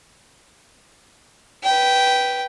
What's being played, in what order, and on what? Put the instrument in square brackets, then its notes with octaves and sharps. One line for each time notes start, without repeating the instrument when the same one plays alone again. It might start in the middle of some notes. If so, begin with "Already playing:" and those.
[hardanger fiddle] B4 G5